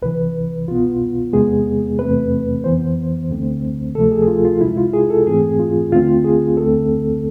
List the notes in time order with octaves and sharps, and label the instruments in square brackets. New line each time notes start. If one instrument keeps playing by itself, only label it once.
[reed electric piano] C2 C3 E3 B4
C2 B2 B3 F4
E2 C3 G#3 B3 G#4
E2 C3 E3 A3 C4 B4
F2 E3 B3 C5
D2 D3 A3 C4
D2 C3 F3 A3 A4
G#4
G#4
F4
F4
C2 C3 G#3 E4
F4
G#4
A4
G#2 E3 A3 C4 G#4
F4
D2 D3 A3 C4 F4
G#4
D2 D3 A3 C4 A4